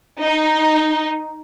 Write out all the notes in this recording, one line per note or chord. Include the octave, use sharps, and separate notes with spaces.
D#4